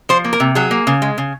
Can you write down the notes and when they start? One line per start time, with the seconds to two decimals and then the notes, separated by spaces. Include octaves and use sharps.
0.09 F3 C5
0.25 A#3
0.33 A#4
0.40 C3
0.55 F#3 G#4
0.71 A#3
0.87 C#3
1.02 G#3
1.18 C#3